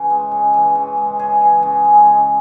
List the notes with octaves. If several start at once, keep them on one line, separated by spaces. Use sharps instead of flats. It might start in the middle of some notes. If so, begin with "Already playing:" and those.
Already playing: C#3 E3
G#3
C#3
E3
C#3
G#3
C#3 G#4
E3
C#3
G#3
C#3